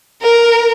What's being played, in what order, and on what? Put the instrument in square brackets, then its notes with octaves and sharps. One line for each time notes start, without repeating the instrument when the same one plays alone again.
[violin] A#4